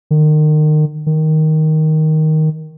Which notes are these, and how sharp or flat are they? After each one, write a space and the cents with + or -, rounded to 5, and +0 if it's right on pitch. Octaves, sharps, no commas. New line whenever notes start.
D#3 -30
D#3 +5